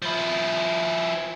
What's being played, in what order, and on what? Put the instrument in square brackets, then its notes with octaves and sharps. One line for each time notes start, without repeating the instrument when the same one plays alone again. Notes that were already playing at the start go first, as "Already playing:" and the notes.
[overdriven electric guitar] F3 E4